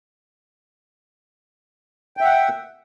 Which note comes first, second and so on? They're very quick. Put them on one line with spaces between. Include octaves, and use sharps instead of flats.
G5 E5 F#5